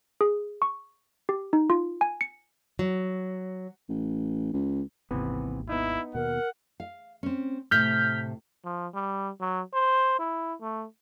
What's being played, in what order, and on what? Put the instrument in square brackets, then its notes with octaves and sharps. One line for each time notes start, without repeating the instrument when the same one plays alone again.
[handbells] G#4
C#6
G4
D#4
F4
G#5
C#7
[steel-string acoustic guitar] F#3
[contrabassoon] A1
C#2
[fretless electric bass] G#1 D#2 [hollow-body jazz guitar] C3 E3 B3
[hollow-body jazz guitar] B3 D#4 [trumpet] E4
[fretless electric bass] D#2 B2 [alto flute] A#4 [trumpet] F#5
[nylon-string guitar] F5
C4 C#4
[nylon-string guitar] A2 C3 [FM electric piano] F6 G6 B6
[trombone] F3
G3
F#3
C5
E4
A3